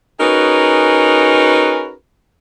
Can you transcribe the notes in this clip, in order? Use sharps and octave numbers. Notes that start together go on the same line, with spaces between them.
C#4 D#4 F#4 G#4 A#4 B4